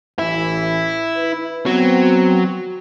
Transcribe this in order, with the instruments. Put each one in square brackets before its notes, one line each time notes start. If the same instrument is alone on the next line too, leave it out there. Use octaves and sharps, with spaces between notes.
[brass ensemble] A1 E3 [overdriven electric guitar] E4
[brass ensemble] B4
[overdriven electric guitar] F#3 [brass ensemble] B3 C4